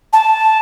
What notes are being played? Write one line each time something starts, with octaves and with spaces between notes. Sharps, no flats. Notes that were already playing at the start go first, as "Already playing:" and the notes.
A5